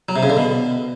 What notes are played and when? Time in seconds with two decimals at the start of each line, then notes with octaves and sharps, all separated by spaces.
0.09 F#3
0.16 C3
0.23 C#3
0.30 D3
0.37 B2